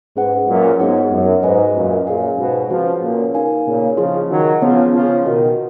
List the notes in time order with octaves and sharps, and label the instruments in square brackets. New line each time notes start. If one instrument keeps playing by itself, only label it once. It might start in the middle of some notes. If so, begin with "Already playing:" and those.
[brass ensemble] G#2 [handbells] C#4 G#4 B4 F#5
[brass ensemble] F#2 A#2
[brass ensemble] G#2 [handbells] B3 D#4 F#4 C#5 F#5
[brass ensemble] F#2
[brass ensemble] G#2 [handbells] F#4 B4 D#5 G#5
[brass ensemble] F#2 A#2
[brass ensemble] F#2 A#2 [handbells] G#4 C#5 F5 G#5
[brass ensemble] G#2 B2
[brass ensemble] C#3 F3 [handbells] C#4 F#4 B4
[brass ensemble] A#2 C#3
[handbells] D#4 A#4 F5 G#5
[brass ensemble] A#2 C#3
[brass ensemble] C#3 F3 [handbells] F4 G#4 D#5
[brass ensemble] D#3 F#3
[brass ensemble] C#3 F3 [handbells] B3 F4 G#4 C#5
[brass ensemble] C#3 F3
[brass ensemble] B2 D#3 [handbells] F#4 A#4 D#5